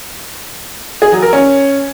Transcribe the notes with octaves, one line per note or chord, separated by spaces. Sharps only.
G#4
F#3
A#4
C#4